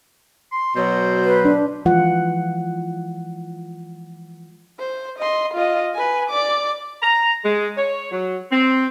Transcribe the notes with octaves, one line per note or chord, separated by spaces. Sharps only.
C6
B2 F#3 C5
B4
D4
E3 F3 G#3 F4 F#5
C5
D#5 C6
F4 D#5
B4 G#5
D5 D6
A#5
G#3
C#5
F#3
C4